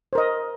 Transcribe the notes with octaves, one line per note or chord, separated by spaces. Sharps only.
A#4 C5 D#5